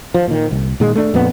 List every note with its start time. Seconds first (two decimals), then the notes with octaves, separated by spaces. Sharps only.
0.14 F3
0.28 A#2 D#3
0.51 C2
0.80 A#2 D#3 G#3
0.95 A3 D4
1.14 F2 A#2 B3